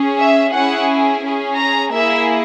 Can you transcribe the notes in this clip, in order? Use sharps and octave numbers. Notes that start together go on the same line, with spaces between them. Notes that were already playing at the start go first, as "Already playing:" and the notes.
Already playing: C#4 G#4
E5
C#4 E4 G#4 F#5
C#4 G#4
A#5
A#3 E4 G#4 E5